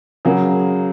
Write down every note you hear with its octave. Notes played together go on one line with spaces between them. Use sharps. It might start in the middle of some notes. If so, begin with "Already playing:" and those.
C#3 F#3 A#3 G#4